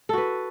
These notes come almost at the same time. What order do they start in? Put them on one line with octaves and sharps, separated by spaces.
A4 F#4 B4